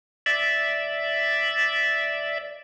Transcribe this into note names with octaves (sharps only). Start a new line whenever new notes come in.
D5 E5